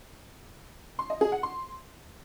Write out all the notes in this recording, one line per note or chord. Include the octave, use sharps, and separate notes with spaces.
C6
D#5
G#4
F#5
C6